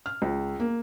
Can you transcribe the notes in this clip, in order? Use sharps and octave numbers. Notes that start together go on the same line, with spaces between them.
F6
C#2
A#3